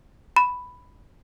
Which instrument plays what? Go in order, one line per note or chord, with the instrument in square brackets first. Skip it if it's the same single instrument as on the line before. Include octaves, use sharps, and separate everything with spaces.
[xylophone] B5